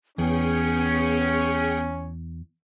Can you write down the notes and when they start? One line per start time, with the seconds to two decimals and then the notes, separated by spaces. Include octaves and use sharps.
0.18 E2 B3 C#4 G#4 G5 C#7